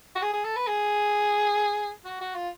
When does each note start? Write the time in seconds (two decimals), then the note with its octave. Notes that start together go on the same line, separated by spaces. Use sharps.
0.16 F#4
0.22 G#4
0.33 G#4
0.44 A4
0.56 B4
0.67 G#4
2.05 F#4
2.21 F#4
2.35 F4